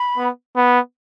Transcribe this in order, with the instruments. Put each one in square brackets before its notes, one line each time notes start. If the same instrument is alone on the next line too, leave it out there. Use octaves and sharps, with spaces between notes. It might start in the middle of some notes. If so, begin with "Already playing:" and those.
Already playing: [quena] B5
[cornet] B3
B3